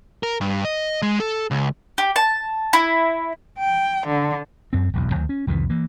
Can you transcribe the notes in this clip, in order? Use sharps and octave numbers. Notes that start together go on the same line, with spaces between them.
A#4
G2
D#5
G#3
A4
C#2
G4
A5
E4
G5
D3
F#2 C4
E1 B1 F2
D2 D#3 F#3
C#4
C2 F2 D#3 E3
E3 A#3